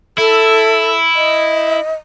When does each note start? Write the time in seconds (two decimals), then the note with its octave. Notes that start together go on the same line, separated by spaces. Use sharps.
0.18 E4 A4
1.16 D#5